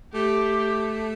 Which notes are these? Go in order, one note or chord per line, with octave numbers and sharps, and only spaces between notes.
A3 G4